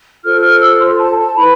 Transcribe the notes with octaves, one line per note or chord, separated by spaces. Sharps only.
F4 A4 C5 F6
F6
E6
C6
A5
A5
E4 B4 B5